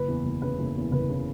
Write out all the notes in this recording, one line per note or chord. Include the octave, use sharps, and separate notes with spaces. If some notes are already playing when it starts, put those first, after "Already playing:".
Already playing: F#1 B4
E2
F#1
C#3 B4
F#1
E2
F#1 B4
C#3